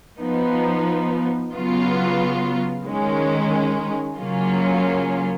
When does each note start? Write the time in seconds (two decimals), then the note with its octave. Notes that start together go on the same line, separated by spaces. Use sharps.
0.19 F3 B3 D#4
1.52 C#3 F#3 B3 F4
2.85 D#3 G#3 C#4
4.18 C#3 F#3 A#3 C#4 F4